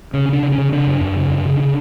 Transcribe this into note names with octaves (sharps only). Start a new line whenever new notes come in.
C#3 C#4
C#3 D4
C#3
C#4
C#3
C#3 D4
F#2
F#2
C#3
F#2
C#3
C#3